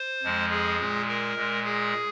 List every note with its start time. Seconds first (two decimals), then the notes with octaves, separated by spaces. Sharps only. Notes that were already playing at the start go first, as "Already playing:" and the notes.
Already playing: C5
0.23 F2 F3 G#3
0.51 G#4
0.80 A#2 G#3
1.08 A#4
1.36 A#2 G#3
1.65 G#4